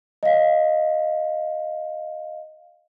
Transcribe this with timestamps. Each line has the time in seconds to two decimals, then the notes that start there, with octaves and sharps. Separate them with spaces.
0.23 D#5 F5